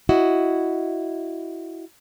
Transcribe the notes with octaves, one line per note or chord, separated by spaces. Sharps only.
E4 F#4 D#5